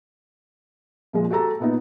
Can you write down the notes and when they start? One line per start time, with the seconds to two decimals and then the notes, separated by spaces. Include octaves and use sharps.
1.13 A#2 F3 G#3
1.30 F#4 G4 A4 A#5
1.60 A#2 B3 D#4